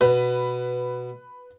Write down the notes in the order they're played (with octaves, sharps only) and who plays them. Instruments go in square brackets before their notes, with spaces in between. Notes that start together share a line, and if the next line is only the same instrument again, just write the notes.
[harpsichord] B2 [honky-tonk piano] B4